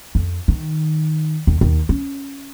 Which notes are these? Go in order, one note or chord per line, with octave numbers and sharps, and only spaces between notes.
F2
D#3
D#2
D#2
C#4